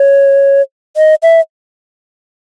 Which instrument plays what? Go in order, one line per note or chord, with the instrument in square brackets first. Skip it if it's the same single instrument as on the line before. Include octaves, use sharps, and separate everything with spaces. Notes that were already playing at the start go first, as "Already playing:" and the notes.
Already playing: [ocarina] C#5
D#5
E5